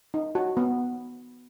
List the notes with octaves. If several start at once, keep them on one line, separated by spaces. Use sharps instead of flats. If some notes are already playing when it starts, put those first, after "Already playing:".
D#4
F#4
B3